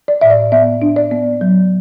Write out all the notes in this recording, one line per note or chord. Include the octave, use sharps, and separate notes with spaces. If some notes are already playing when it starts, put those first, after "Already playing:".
D5
A2 E5
D5
B3 E5
D4
D5
B3
F#3